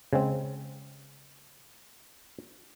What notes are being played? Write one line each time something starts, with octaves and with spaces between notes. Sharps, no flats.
C#3 G#3 C4